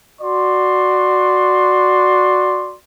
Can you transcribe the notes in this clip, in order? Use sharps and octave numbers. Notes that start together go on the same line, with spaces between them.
F#4 D5 C6